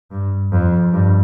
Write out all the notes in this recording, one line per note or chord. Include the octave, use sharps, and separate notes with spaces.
G2
F2
G2